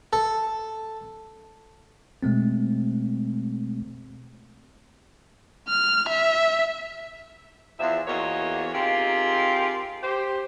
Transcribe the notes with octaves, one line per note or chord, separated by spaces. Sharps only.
A4
B2 G#3 A3 C4
F6
E5
E2 F3 E5
E2 A#3 F4 F#4 C#5 D#5
C4 D#4 F4 G4 G#4 A#4
G4 C5